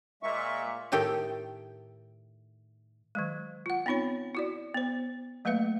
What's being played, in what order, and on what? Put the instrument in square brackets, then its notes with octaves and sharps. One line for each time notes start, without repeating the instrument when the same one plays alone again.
[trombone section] A#2 [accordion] G#3 E5 C#6
[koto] A2 D#3 G4 A4 G5
[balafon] D#3 F#3 G#3
F4 F#5
B3 C4 D#4 F4 C#5
E4 F#4 D5
B3 C5
F#3 A3 A#3 B4 E5 F5